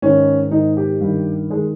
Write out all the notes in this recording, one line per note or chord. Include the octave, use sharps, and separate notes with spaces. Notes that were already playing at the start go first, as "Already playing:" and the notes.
G#2 D#3 C#4
G#2 D#3 D#4
G4
G2 D#3
D#3 G#3